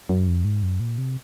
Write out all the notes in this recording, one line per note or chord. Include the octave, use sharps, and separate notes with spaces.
F#2
F2
G#2
F#2
A#2
C3